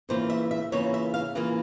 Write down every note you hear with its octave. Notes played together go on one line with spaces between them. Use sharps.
C#3 E3 A#3 F4 C5
E5
E5
C#3 E3 A#3 F4 C#5
E5
F5
C#3 E3 A#3 F4